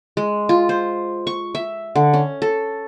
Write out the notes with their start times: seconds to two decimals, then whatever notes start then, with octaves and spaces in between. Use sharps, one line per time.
0.17 G#3
0.49 F4
0.69 C5
1.27 C#6
1.55 E5
1.96 D3
2.13 C#4
2.42 A4